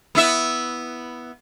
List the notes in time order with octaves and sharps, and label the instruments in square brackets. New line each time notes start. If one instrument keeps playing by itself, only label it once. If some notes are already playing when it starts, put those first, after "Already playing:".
[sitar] B3 E4 E5